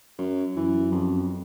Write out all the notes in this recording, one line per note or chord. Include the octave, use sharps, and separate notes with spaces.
F#2
F#2 E3
F2